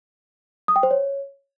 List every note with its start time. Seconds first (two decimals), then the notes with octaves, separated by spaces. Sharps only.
0.68 D#6
0.76 G5
0.83 C5
0.91 C#5